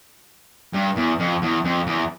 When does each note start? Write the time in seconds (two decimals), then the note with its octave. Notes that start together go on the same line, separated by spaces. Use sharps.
0.73 G2
0.96 E2
1.19 F2
1.42 E2
1.64 F2
1.87 E2